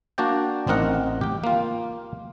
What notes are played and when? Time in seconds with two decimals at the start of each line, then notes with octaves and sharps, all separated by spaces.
0.18 A#3 D4 F#4 D5 G5
0.67 A1 C4 D#4 A#4 F#5
1.21 G4 G5
1.44 A#3 F4